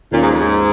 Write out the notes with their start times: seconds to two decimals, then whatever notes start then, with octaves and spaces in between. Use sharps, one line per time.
0.11 D#2 A#2 D#3 C#4 F4
0.21 G#2
0.30 F2
0.39 G#2